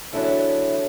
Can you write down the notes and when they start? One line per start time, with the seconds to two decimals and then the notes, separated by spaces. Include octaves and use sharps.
0.13 E2 D3 F#3 D4 E4